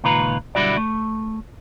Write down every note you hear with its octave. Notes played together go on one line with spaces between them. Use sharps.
C#2 A#2 D#3 F4 B4 A#5
B1 D3 G3 E4 F#4 D5
A3